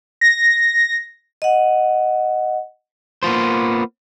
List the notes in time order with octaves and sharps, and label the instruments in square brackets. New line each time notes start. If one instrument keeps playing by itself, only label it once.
[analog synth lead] A#6
[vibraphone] D#5 F#5
[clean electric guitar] A#3 B3 F4 C5